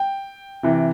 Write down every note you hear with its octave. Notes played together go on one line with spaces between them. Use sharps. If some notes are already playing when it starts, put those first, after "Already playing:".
Already playing: G5
C3 E3